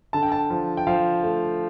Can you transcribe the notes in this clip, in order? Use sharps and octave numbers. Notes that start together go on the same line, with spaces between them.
D3 A5
G5
A5
F3
G5
F3 F5
A3